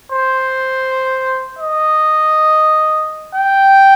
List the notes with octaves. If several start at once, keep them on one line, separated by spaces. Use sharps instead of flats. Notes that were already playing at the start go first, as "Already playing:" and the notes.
C5
D#5
G5